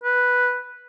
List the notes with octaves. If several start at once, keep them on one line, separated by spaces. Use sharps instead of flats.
B4